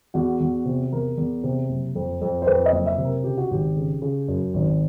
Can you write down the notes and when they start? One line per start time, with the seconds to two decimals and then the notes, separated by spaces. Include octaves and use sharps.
0.14 E2 F#4
0.40 E2
0.66 C3
0.92 E2 A#4
1.17 E2
1.44 C3
1.69 F#1
1.95 F2
2.21 F2
2.42 C5
2.47 F2 B4
2.66 D#5
2.72 F#1
2.86 E5
2.98 C3
3.04 A#4
3.24 C#3 G4
3.37 F#4
3.51 G#1 G4
3.76 C#3
4.02 C#3
4.28 F#2
4.54 G#1